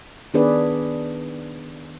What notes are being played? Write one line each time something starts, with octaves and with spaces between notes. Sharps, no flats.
D#3 B3 D4 G#4 B4 D5